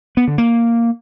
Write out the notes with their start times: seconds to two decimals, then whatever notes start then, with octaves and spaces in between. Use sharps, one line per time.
0.17 B3
0.28 D3
0.38 A#3